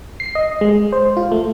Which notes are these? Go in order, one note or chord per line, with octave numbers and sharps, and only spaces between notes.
C7
D#5
G#3
C5
F4
A3